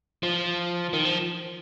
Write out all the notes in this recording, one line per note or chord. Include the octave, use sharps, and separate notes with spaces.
F3
D#3
F3